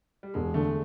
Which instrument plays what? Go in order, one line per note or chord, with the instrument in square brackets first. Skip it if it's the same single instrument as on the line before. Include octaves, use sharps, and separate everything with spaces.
[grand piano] G3
[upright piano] E1 [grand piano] G#3
[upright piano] D3 [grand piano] A3